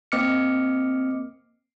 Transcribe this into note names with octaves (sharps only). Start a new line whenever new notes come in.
A#3 C4 D#5 D6 F6 C#7